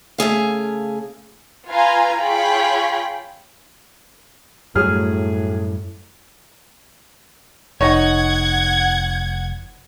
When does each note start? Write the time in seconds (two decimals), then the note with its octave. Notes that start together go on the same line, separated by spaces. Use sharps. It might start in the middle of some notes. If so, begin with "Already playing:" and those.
0.18 C#3 A3 G#4 F5
1.68 F4 B4 F5 G#5 A#5
2.21 F4 G#4 C#5 G5 B5
4.75 F#2 A2 F#3 G3 A3 G#4 F6
7.81 F1 D#4 C#5 F#5 G#6